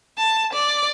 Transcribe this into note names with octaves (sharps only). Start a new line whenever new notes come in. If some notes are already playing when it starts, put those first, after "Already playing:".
A5
D5